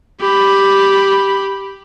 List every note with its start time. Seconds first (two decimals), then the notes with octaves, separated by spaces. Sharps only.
0.21 G4 B5